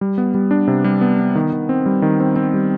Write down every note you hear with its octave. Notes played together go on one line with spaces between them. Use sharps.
G3
B3
G3
D4
C3
G3
B3
B3
D#3
D#3
C4
G3
D#3
C4
C4
G3